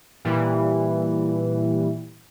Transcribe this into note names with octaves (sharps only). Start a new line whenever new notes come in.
A#2 E3 G3